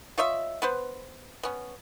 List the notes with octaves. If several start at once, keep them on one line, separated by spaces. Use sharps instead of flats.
F4 C#5 D#5 E5
B3 B4 C5
B3 C#4